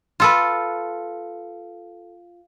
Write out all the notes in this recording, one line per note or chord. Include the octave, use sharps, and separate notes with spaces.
F4 A4 B4